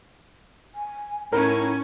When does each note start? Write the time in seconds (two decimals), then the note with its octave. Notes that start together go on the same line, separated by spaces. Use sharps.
0.75 G#5
1.33 A2 C#4 D#4 A#4 G#5